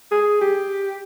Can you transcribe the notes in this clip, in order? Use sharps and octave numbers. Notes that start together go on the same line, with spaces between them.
G#4
G4